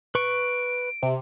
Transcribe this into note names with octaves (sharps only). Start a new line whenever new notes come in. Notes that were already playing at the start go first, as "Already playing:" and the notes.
B4 C#6 D7
C3